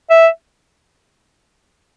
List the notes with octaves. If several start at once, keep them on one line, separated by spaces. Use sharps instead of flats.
E5